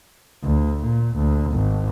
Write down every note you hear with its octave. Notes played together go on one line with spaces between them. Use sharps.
D2
A#2
D2
G#1